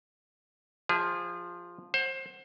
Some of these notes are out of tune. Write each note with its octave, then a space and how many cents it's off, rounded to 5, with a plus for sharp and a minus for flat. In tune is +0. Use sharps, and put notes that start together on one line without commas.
F3 +0 G#4 -30 E5 -25
C5 +25 F#5 +0